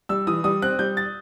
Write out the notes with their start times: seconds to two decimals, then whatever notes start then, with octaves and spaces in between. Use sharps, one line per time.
0.09 G3 E6
0.27 E3 D#6
0.44 G3 D#6
0.62 C4 F#6
0.79 G3 G6
0.97 A6